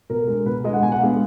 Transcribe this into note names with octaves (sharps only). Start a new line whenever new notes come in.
B2 A#4
G#3 D4
B2 B4
G#3 D4 D#5
F#5
B2 G#5
F#5
G#3 B3 D4 F5